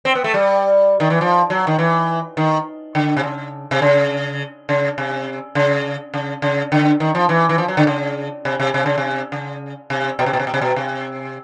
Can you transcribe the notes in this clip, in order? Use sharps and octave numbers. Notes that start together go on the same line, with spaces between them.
C4
B3
A3
G3
D#3
E3
F3
F#3
D#3
E3
D#3
D3
C3
C#3
C3
C#3
C#3
C3
C#3
C#3
C#3
D3
D#3
F3
E3
E3
F3
F#3
D3
C#3
C3
C3
C3
C#3
C3
C#3
C3
B2
C3
B2
C3
B2
C3
B2
C3